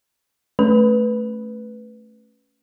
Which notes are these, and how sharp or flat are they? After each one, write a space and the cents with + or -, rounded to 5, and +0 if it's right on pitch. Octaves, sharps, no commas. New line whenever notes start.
A3 +0 C#4 +0 B4 +0